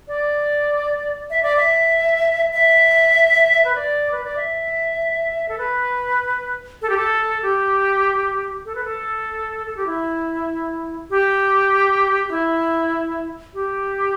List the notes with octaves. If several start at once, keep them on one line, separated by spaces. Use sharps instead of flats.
D5
E5
D5
E5
E5
B4
D5
B4
D5
E5
A4
B4
A4
G4
A4
G4
A4
B4
A4
A4
G4
E4
G4
G4
E4
G4